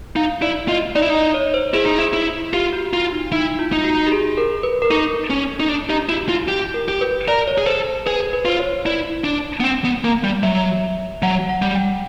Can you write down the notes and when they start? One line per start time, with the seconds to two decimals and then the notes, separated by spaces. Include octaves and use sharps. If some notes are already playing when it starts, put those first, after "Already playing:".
0.16 D#4 F5
0.42 E4 D5
0.68 F4 D#5
0.95 D#4 D5
1.02 E4
1.10 D#4
1.15 D#5
1.34 C#5
1.54 C5
1.74 E4 G#4
1.86 D#4
1.98 E4
2.13 E4
2.53 F4 G4
2.73 F#4
2.93 E4 F4
3.12 D#4
3.32 D#4 E4
3.59 F4
3.72 D#4
3.84 F#4
4.07 G4
4.12 G#4
4.37 A#4
4.63 B4
4.82 A#4
4.90 D#4 A4
5.30 C#4
5.60 D#4
5.69 D4
5.89 D#4 G4
6.09 E4 F#4
6.29 E4 F4
6.48 E4 G4
6.74 A#4
6.88 G4
7.01 B4
7.28 A#4 D5
7.48 C#5
7.58 G#4
7.66 A4 C5
8.06 G#4 B4
8.33 B4
8.45 F4 C5
8.60 C#5
8.85 E4 D5
9.24 D4
9.60 B3
9.64 C4
9.84 B3
10.04 A#3
10.24 G3
10.43 F#3 E5
11.22 F#3 F#5
11.49 F#5
11.62 G3
11.75 G5